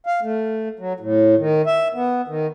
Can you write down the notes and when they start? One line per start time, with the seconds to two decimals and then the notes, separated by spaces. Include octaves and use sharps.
0.06 F5
0.22 A3
0.79 F#3
1.00 A2
1.38 D#3
1.66 E5
1.94 B3
2.28 D#3